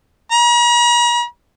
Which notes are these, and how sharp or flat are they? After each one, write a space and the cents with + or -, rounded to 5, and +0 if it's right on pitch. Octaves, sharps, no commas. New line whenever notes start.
A#5 +45